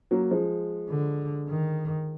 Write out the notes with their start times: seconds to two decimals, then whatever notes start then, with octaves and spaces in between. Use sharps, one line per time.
0.11 F#3 A#3
0.31 F3 G#3
0.89 D3
1.49 D#3